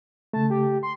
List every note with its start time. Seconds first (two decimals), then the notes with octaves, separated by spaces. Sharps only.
0.33 C#3 A3 A5
0.50 G4
0.83 C6